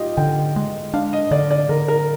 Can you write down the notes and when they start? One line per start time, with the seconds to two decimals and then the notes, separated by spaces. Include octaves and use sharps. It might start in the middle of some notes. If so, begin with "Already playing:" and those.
Already playing: D#4 F4 G4 D#5
0.17 D3 G5
0.56 G#3
0.94 D4 F5
1.13 D#5
1.31 D3 D5
1.51 D5
1.69 D3 A#4
1.88 A#4